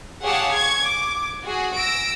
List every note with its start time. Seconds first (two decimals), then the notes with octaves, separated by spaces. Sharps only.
0.22 G4 G#4 C#5 F5 F#5 A5
0.54 C#6 G#6
0.87 D6
1.45 F#4 G#4
1.78 E6 A#6 D7